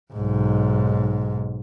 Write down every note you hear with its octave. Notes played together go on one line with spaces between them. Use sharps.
B1 G#2